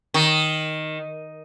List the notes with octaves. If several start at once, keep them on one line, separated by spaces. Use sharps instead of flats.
D#3